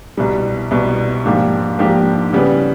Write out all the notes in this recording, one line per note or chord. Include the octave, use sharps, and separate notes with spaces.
C2 B2 G3
C2 B2 G3
G#2 F3 A#3 D4 G4
G#2 F3 A#3 D4 G4
C#3 E3 G3 B3